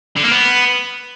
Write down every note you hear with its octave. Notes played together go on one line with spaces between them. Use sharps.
D3
A#3
B3